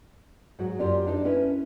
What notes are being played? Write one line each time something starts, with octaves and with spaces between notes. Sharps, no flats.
G#2 F#3 F#4
F#2 F4 G4 A#4 D5
D4 D#4 A4 C5 D5
C#4 E4 A#4 B4